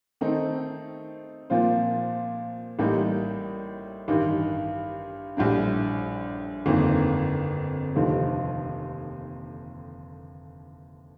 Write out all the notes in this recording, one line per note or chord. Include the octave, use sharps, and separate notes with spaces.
D#3 A3 C4 D#4 A4
A#2 F3 C4 F4 C5
A1 A2 G3 A#3 D#4
A1 G2 D#3
A#1 A2 G3 D4
G1 F2 D#3 A#3
F1 D#2 D3 F3 A3